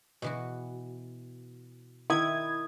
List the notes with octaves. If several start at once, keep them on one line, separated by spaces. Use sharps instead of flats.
B2 E3 F#4
D#3 E4 D#6 G#6